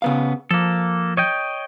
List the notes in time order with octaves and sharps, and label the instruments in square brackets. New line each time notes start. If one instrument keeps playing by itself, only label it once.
[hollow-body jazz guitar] C#3 B3 F5
[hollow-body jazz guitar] F3 [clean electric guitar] A#3 A4
[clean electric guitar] C#5 D#5 G5